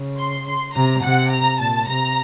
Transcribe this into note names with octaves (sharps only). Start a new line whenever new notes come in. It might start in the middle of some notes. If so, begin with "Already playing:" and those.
Already playing: C#3
C6
C6
C3 A#5
C3 F#5
A#5
A#2 A5
C3 A#5